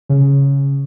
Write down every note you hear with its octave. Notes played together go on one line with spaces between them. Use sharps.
C#3